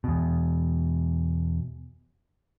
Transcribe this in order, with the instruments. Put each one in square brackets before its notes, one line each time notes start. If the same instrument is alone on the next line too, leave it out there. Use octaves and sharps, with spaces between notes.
[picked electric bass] E2 B2